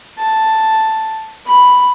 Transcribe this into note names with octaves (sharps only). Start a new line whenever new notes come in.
A5
B5